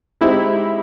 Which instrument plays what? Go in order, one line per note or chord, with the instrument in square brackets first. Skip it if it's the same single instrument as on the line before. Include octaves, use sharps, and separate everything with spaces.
[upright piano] G#3 C4 D#4 G4 [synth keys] E4